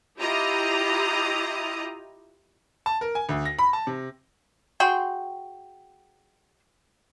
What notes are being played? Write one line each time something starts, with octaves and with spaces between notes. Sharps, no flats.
E4 F4 G4 D#5 A#5 D#6
A5
A#4
G#5
D2
A#6
B5
A5
C3
F#4 G#4 G5 C6